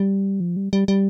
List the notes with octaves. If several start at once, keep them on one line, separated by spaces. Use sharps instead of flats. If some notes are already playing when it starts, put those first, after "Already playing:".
Already playing: G3
F3
G3
G3
G3